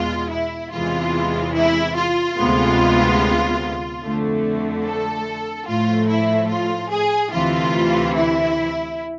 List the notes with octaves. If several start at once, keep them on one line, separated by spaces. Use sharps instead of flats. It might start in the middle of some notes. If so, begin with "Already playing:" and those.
Already playing: E2 B2 G#3 B3 F4
E4
E2 C3 E3 G#3 F4
E4
F4
D2 C3 G#3 B3
F2 D3 A3
A4
A2 F3 A3 F4
E4
F4
G#4
D2 C3 E3 F4
E4